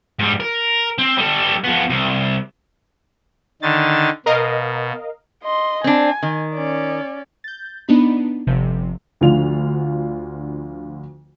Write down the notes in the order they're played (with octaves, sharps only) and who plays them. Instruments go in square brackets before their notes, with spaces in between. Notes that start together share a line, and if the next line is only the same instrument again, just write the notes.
[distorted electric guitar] G#2 G3
A#4
C4
G3 A4
F3 B3
C2
[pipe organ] D3 D#3 A6
[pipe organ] B2 [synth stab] A#4 D#5 F5
[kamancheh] D#5 C6
[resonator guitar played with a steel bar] C4 D4 [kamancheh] G#5
[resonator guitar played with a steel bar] D#3
[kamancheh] C#4 D5
[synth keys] G6 A6
B3 D4 D#4 B5
G1 C3 F3
[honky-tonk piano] D2 D3 F3 F4 F7